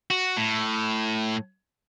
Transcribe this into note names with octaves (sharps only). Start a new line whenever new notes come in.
F#4
A2